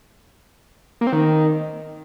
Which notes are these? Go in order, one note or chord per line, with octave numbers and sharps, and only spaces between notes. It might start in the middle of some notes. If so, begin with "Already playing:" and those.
A#3
C4
D#3